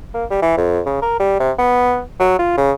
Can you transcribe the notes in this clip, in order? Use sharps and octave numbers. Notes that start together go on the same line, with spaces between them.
A#3
G3
E3
F2
C#3
A#4
G3
C3
B3
F#3
F4
C#3